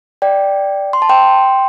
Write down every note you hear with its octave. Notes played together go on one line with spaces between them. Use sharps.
D5 G5
C6
A5
G5 C6